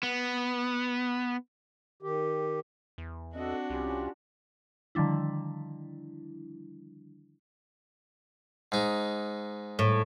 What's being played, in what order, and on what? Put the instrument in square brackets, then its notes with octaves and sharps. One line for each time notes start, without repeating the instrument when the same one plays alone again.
[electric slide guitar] B3
[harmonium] D#3 G4
[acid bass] E2
[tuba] C4 [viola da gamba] D4 F#4 [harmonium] A4 D#5
[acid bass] C2 [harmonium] C#4 F4 G4
[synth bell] D3 D#3 F3 G3 D4 E4
[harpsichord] G#2 D#4
[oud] A2